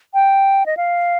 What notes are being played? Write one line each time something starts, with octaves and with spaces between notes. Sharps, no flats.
G5
D#5
F5